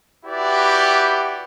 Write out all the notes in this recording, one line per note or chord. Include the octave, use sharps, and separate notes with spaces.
E4 F#4 G4 B4 D5